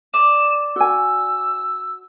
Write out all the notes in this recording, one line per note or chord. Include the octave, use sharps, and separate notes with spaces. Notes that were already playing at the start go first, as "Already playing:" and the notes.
D5 E7
F#4 G#5 E6